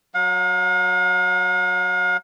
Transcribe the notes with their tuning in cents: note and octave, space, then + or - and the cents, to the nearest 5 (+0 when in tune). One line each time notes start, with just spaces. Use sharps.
F#3 +0 F5 +45